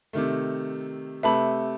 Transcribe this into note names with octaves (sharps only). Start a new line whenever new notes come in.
C3 D#3 A3
C3 A3 B4 E5 A5 B5